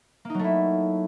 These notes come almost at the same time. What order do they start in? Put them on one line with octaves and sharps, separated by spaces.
A#3 D#4 F#3 A3 E4